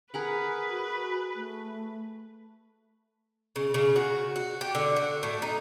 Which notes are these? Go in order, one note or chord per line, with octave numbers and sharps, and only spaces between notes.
G#4 A#4 B4 F#5
F#4
A3
C#3
C#3
F#4
F#4
G4
D3
F#4
A2
D#4